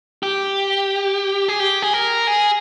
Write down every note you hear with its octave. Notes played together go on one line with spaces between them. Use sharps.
G4
G#4
G4
G#4
A#4
G#4